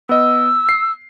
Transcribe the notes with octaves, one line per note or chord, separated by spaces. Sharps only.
B3 D#5 E6
C7